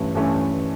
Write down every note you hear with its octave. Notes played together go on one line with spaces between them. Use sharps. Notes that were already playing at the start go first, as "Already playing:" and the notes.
Already playing: G2 E3 A3 C#4
G2 E3 A3 C#4